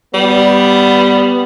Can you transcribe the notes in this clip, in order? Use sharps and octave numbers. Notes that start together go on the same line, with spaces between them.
G3 B3